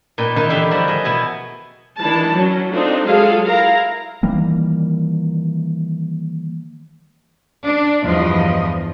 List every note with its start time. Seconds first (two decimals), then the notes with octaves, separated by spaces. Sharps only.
0.18 A#2 D#4 B4 G5
0.36 D#3 E3 D#4 F4
0.49 D3 E4 G4 E5 F5 C6
0.71 F3 G3 E4 F#4 A#4
0.88 G#4 D#5 E5
1.04 B2 B3 E4 G#5
1.99 D#3 E3 D4 E4 A5
2.32 F#3 C#4
2.72 C4 D4 D#4 F4 A4
3.06 F#3 G#3 F4 G#4 A4 F5
3.46 E4 A#4 F5 A#5
4.23 D#3 E3 G3 A#3
7.65 D4
8.03 E2 G2 F3 D#5